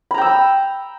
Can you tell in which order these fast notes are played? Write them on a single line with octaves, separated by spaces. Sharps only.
B5 A#5 G5 E6